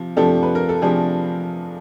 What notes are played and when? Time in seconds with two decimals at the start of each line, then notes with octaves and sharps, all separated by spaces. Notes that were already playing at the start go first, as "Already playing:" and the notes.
Already playing: C3 F3
0.17 C3 F3 A3 D4 G4 A4
0.43 B4
0.55 A#4
0.69 A4
0.82 C3 F3 A3 D4 G#4